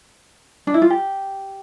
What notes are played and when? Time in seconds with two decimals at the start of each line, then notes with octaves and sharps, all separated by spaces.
0.67 D4
0.74 E4
0.82 F4
0.90 G4